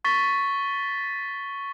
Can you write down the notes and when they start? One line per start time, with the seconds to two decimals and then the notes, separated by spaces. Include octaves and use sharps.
0.05 C#6 A6 B6 G7